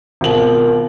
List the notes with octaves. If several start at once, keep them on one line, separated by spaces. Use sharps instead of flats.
G#1 B2 F4 A#4 F#7